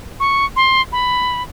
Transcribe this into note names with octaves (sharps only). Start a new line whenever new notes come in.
C#6
C6
B5